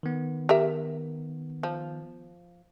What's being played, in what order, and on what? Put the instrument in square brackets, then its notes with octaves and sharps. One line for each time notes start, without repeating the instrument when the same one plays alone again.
[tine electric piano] D#3 B3
[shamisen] G4 A#4 E5
F3